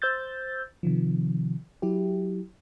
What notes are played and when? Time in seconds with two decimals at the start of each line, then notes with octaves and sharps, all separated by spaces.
0.02 C5 E6 G6 A6
0.83 C3 D#3 F3
1.82 F#3 E4 G4